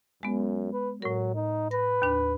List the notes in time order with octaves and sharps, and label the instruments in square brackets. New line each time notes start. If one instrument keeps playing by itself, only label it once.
[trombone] F#2 [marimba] G#3 B3
[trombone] B4
[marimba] A2 A#4 [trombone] F#3
[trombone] D#4
[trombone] B4 [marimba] A#6
[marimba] D#2 D4